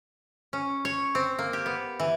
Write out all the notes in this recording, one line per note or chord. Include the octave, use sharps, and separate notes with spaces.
C#4
C#5
C4
A#3
G4
B3
E3